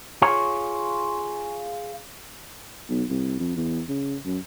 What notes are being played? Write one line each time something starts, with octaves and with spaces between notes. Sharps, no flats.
F4 G#4 C#5
B1
C2
F2
E2
C#3
F#2